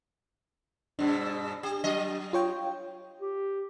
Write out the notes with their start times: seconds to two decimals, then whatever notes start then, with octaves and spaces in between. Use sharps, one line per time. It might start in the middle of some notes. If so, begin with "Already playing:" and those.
0.99 G2 B2 D4
1.63 G4
1.84 F#3 D#5
2.33 F4 C#5 G5
3.21 G4